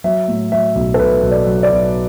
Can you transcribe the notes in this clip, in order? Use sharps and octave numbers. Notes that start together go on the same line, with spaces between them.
F#3 E5
A2
F#3 E5
B1
A4
B1 B4
B1
D5
F#3
D5
B1